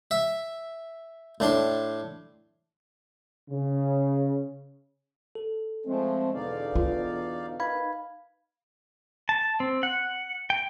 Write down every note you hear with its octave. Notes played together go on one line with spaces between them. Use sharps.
E5
A2 D4 C6
C#3
A4
F3 G#3 A3 C4
E2 B2 D3 D#4 D5 F5
F4
D#3 D#4 B4 F5 B5 G#6
A5
C4
F#5
G5